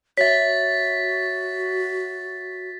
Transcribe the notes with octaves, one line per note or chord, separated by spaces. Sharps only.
F#4 C#5 E5 A6 B6